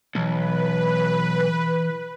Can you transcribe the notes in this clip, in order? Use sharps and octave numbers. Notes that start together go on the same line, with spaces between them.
B1 E3 B4